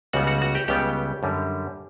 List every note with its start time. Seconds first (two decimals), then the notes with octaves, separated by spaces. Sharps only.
0.13 C#2 C#3 G3 B3 F#4 F#5
0.27 F#4 F#5
0.42 F#4 F#5
0.55 G4 G5
0.68 C#2 C#3 G3 B3 G4 G5
1.23 F#2 D3 G3